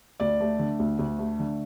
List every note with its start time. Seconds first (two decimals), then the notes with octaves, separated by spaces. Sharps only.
0.20 D2 D5
0.40 A3
0.59 D3
0.80 D2
0.99 D2
1.19 A3
1.39 D3